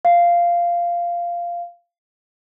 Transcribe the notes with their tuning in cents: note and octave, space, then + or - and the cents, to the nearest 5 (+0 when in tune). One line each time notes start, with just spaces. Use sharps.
F5 -10